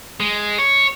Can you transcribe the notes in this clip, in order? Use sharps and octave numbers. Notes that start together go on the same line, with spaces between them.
G#3
C#5